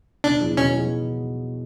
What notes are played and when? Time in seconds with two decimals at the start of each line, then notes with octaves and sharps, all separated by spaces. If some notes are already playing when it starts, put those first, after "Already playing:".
0.24 B2 D4
0.40 F#3 B3 E4 G#4
0.57 B2 C#4
0.73 F#3 B3 E4 G#4